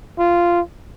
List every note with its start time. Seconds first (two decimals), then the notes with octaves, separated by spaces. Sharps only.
0.19 F4